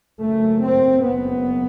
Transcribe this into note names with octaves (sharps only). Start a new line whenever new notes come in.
F#1 F#2 A3
C4
F#1 F#2 B3